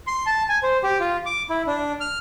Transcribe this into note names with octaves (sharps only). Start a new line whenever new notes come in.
C6
A5
G#5
C5
G4
F4
D6
E4
D4
F6